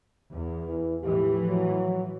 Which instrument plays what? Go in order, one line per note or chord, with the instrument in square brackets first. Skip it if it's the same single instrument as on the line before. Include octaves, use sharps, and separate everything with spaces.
[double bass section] E2
[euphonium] E3
[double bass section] A2 E3 F3 [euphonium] G4
[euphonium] F#3